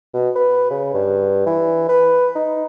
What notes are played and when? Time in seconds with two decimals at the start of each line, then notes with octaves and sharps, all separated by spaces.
0.14 B2
0.36 B4
0.71 C#3
0.94 G2
1.46 E3
1.89 B4
2.36 D#4